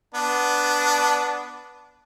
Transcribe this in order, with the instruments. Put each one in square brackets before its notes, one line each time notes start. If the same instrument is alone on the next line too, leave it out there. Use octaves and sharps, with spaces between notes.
[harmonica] B3 D4